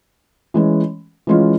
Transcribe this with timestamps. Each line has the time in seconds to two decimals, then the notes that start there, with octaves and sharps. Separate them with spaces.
0.54 E3 G#3 C#4
1.27 E3 G#3 C#4 F4